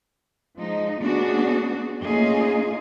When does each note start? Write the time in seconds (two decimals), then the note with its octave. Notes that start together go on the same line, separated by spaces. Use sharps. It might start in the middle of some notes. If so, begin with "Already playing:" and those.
0.58 F3 G#3 D#4
1.01 A3 B3 C#4 D4 F#4 G#4
2.02 A3 A#3 C#4 D#4 F4 G#4